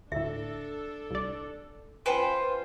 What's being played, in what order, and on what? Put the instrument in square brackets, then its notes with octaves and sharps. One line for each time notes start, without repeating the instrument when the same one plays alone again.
[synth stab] D2 A2 [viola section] D4 A4 [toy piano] E5
[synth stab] C2 D5
[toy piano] C#4 G5 G#5 [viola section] F4 [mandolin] B4 C5